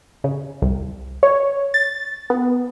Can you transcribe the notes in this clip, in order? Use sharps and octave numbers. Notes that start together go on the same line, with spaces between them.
C#3
C2
C#5
A6
B3